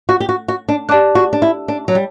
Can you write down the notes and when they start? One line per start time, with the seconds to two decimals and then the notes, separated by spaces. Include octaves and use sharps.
0.09 F#4
0.20 G4
0.29 F#4
0.48 F#4
0.68 D4
0.89 D4 G4 D5 A5 D6 F#6
1.15 F#4
1.33 D4
1.42 E4
1.68 D4
1.88 F#3
1.95 G3